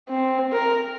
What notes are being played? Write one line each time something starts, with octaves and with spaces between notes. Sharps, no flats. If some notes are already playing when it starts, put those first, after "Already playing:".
C4
A#4